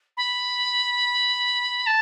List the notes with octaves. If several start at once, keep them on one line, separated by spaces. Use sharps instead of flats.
B5
A5